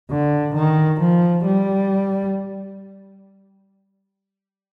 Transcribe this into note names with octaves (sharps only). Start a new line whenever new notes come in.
D3
D#3
F3
G3